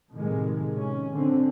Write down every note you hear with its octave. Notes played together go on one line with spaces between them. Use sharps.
A2 C3 D#3 G#3
C#4
D3 C4